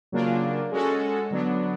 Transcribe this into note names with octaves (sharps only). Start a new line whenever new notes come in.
C#3 F#3 A#3 D4 F4
G#3 C#4 F#4 A4
D3 F#3 B3 D4